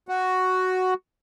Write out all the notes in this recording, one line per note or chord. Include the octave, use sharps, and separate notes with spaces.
F#4